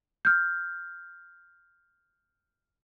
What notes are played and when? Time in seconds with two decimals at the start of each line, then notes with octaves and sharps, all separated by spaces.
0.25 F6 G6